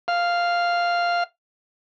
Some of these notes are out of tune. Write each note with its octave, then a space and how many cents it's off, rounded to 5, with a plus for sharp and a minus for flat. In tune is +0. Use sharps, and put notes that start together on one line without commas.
F5 -5